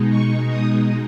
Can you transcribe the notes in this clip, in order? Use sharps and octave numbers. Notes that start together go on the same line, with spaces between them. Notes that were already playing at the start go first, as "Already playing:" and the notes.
Already playing: B2 G#3 D#4
C#6
D#6